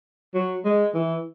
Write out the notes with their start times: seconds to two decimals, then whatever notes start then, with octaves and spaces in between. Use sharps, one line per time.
0.34 F#3
0.65 G#3
0.94 E3